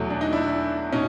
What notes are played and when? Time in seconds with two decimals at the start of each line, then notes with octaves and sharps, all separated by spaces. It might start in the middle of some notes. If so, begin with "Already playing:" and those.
Already playing: E2 B2 F#3 A3
0.10 D4
0.21 D#4
0.33 D4 E4
0.92 B2 C#4 D#4